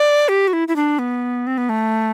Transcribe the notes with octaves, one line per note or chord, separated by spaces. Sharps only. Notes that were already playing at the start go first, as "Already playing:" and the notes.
Already playing: D5
G4
F#4
E4
E4
D4
B3
C4
B3
A3